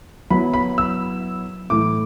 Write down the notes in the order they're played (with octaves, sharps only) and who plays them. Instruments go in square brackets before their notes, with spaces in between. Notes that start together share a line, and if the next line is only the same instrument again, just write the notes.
[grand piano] F#3 B3 E4 B5
B5
E6
A2 E3 A3 E4 D6